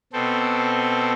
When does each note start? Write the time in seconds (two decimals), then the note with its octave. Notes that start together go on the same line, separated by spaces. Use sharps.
0.13 B2 C4 A4